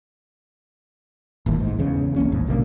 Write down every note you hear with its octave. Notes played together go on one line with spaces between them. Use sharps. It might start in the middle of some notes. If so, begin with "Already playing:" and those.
D#1 A1 D#2 A2
G#2
E2 C#3
C2 A#3 C#4
A1 D#2 G#2
B2 D3 G3 A#3